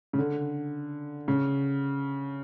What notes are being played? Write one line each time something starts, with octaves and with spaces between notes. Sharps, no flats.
C#3
D3
C#3